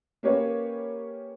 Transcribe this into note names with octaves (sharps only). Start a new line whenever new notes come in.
A#3 C#4 G4 A#4 B4 C#5